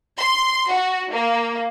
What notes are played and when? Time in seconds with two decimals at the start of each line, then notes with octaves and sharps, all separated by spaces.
0.18 C6
0.70 F#4
1.11 A#3